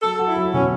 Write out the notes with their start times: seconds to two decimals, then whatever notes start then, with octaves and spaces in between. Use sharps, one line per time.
0.03 F#3 A4
0.19 F#4
0.28 E4
0.36 F#3
0.54 B2 C#4